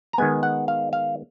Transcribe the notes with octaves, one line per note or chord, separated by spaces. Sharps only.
A#5
D#3 G#3 B3 G#5
F#5
F5
F5